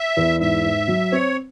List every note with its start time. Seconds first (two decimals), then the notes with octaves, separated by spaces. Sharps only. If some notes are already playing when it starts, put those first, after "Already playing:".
Already playing: E5
0.17 E2
0.40 G#2 E5
0.65 G#2
0.88 F#3
1.12 C4 C#5